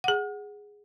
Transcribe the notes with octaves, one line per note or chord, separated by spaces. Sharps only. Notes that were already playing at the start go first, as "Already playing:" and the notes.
G#4 F#5